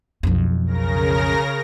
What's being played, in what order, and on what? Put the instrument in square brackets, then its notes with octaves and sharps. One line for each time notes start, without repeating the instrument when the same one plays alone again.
[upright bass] B1 F2
[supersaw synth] C#3 A#4 A#6